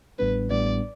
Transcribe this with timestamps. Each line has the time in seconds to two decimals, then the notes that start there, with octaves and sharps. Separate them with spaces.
0.19 A1 A2 G3 B3 D4 B4
0.50 A1 A2 G3 B3 D4 D5